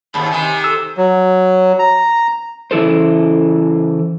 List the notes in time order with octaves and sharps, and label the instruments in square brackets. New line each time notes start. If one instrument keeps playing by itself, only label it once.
[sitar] D#2 G#2 [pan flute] B5
[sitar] C3 D#3 [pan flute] G#5
[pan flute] A4 [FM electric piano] E6
[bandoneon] F#3
A#5
[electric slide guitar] C#3 E3 E4 A4 C5